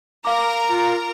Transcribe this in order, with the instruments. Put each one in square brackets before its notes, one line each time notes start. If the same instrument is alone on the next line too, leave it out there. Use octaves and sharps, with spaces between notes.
[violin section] A#4 A#5 [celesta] F5 D6
[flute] F4